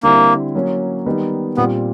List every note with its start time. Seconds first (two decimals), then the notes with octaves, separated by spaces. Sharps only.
0.03 D3 G3 A#3 C4 E4
0.55 F#3 A#3 C#4
1.06 D#3 G3 B3 D#4
1.57 A#2 G3 B3 C4